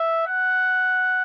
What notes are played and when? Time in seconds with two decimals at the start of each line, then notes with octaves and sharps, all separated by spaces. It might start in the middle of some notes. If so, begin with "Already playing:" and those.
Already playing: E5
0.27 F#5